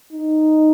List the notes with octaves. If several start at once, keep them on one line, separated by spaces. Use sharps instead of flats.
D#4